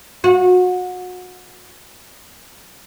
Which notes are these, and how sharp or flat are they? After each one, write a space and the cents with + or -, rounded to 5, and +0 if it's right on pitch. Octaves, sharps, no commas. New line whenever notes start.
F#4 -30